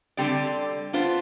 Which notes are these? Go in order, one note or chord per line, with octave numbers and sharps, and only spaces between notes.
D3 G3 C4 G4 D5
B3 D4 F4 C5